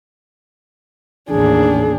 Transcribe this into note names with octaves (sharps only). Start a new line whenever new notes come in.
A1 D#2 D4 G#4